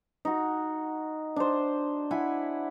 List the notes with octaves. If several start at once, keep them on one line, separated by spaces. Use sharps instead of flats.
D#4 F#4
D4 C5
E4 F#5 G#5 B5